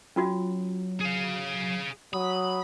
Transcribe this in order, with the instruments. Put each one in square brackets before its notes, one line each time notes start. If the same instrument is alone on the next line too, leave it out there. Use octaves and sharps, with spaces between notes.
[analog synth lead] F#3 [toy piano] C#4 F4 F#4
[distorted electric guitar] G#4 F5
[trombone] F#3 [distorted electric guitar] B5 [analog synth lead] D#6